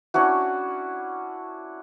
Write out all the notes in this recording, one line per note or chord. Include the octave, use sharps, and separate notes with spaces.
C#4 D4 E4 F#4